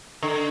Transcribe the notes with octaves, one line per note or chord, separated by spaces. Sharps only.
D3